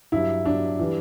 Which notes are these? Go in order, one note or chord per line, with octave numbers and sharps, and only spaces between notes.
G2 F#3 E4
G2 F#3 D4
E3 G3